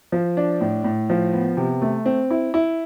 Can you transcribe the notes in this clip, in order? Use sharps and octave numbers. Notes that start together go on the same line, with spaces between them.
F3
D4
A2
A2
F3
B3
C3
A3
C4
E4
E4